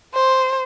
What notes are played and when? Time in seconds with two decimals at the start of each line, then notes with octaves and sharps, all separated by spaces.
0.14 C5